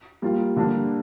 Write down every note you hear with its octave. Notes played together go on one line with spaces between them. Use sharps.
G3 A#3 F4
D3 G3 A#3 D4